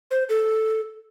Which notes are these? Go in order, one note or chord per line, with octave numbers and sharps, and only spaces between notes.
C5
A4